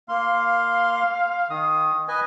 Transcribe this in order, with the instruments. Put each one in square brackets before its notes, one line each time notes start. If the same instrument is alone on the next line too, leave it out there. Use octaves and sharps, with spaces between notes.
[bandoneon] A#3 C6 [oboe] F5
[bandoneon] D#3 [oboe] D#6
[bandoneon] B4 D#5 G#5